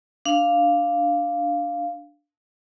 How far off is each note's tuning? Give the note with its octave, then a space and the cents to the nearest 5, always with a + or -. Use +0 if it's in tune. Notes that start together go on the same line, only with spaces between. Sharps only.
D4 +0 F5 +0